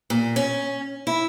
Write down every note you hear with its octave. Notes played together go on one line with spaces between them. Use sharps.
A#2
C#4
E4